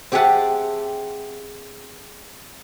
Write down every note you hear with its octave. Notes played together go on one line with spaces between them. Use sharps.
C4 G4 G#4 E5 F#5 A5